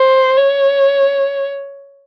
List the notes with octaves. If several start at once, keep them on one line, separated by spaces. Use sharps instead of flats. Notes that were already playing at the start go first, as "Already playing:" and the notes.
Already playing: C5
C#5